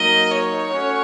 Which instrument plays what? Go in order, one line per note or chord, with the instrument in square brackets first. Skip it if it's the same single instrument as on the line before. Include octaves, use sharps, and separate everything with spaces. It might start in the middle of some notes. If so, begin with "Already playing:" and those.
Already playing: [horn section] F#3 A#3 D#4 A#4 [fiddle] D#5
[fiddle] C#5
[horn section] A3 C#4 F#4